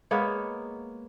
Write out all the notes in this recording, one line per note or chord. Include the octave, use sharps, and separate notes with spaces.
G#3 A#3 B3 C#5